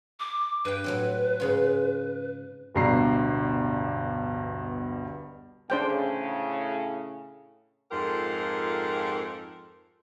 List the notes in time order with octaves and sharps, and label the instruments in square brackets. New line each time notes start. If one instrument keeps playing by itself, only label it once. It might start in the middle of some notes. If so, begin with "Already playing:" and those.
[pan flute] D6
[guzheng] G2 G5 [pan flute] B4
[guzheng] A2 F#3 C4
G#2 C#3 F4
[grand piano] D1 G1 G2 B2 A#5 C7
[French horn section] A2 C#3 [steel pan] D4 C5 G5
[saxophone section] F2 G#2 F4 G4 A4 A#4